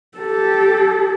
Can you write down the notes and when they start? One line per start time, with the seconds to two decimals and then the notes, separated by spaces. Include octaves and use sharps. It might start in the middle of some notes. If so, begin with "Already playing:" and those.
0.18 G4 A4